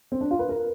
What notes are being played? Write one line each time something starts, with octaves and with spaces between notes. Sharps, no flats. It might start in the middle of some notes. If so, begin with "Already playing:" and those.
C4
D4
F4
B4
A#4